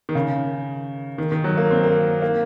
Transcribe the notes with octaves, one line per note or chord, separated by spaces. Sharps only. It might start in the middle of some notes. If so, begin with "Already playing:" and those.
D#3
C#3
D#3
D#3
F#3
A#3
C4
A#3
A#3